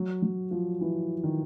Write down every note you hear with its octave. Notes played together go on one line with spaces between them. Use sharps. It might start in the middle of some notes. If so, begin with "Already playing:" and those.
Already playing: F#3
F#3
F3
E3
D#3